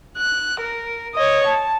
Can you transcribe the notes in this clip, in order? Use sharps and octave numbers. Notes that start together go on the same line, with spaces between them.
F#6
A#4
C#5 D#5
A5